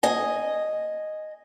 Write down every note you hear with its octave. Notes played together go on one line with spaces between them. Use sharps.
D#5 G#5